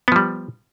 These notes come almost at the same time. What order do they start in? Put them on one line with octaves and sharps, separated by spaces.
B3 F3 G3